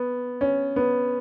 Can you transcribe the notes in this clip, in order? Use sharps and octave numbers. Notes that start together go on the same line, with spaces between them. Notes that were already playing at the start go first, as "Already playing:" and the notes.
Already playing: B3
C#4
B3